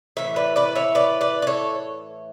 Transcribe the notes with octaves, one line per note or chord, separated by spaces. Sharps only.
A2 E3 E5
B4 D5
B4 D5
C#5 E5
B4 D5
B4 D5
D5
A4 C#5